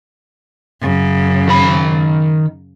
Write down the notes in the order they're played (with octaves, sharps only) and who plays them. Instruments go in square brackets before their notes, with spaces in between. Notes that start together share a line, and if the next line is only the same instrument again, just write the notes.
[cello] F#2 C#3
[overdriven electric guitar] D#3 B5